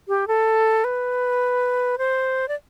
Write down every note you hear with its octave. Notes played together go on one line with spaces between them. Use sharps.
G4
A4
B4
C5
D5